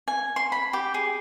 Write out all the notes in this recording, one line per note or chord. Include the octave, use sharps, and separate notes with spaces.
G#5
C6
B5
G4
G#4